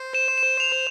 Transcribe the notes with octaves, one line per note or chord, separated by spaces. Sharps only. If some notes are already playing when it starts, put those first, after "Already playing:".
Already playing: C5
E7
E7
F7